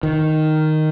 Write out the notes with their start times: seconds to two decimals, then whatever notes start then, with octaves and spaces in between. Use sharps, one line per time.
0.03 D#3